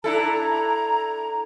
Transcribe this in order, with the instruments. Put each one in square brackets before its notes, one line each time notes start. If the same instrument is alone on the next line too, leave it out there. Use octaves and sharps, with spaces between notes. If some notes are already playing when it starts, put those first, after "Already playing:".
[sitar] D4 E4 A4 [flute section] A#5